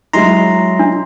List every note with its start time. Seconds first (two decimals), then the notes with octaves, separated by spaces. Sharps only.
0.13 F#3 G#3 E4 A#5 C6
0.79 D4